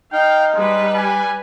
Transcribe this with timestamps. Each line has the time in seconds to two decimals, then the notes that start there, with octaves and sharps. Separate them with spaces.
0.13 D#4 F5 G5
0.55 G3 G#3 B4
0.94 G#5